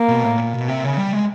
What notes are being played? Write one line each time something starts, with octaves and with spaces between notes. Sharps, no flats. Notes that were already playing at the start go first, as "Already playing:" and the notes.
Already playing: A#3
B2
A2
A#2
B2
C3
C#3
G3
G#3